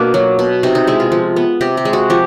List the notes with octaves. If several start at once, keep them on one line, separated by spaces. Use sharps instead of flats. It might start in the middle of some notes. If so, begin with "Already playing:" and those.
Already playing: B2 A#3 D4
F#3
B2
C3 D#4
D#4
G#3 E4
F4
F3
B3
C3 G4
G4
G#3
F#4
F3 G4